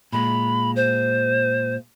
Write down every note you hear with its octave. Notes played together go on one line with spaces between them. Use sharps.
A#2 G#3 B5
C5